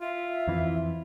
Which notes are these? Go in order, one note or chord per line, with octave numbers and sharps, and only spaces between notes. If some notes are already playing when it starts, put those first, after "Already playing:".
F4 E5
F2 E3